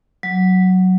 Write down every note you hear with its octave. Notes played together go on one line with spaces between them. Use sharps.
F#3